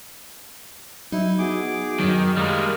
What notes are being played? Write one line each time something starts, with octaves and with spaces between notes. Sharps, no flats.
F#3 D#4 E4
B3 F#4 G#4 D6
F#2 D#3 F#3
G3 G#3 A#3 D#5 F6